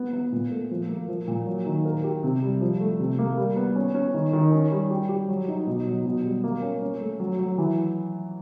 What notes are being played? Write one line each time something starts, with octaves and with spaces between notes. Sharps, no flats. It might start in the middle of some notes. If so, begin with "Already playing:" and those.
Already playing: B3
B3
A#2
A3
F3
A#3
F3
A#2
F#3
D#3
A#4
G4
C3
G3
F3
A3
C3
A#3
G3
B3
C#4
C#4
D#3
D#3
C#4
G3
G4
G4
F#3
D#4
B2
F#3
B2
G3
A#3
C#4
C#4
A3
F#3
F#3
E3